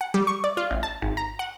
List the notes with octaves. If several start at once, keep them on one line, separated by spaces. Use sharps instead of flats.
F#5
G3
C#6
D5
F4
A1
A5
G#1
A#5
F#5